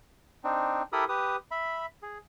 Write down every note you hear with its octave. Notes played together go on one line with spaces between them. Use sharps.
C4 D4 D#4
E4 G4 A4 A#4 B5 D#6
G4 B4 D#6
E5 B5
G#4